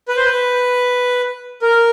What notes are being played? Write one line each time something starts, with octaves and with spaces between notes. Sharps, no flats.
B4
C5
B4
A#4